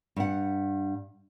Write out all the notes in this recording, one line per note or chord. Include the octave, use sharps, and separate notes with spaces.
G2 F#5